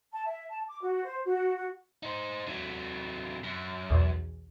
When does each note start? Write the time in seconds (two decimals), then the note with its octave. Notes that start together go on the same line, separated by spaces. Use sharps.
0.12 A5
0.26 E5
0.49 A5
0.67 D6
0.82 F#4
1.04 C5
1.24 F#4
1.56 F#4
2.03 D#4 C5
2.47 C3 F#3
3.44 F#2
3.90 B1 E2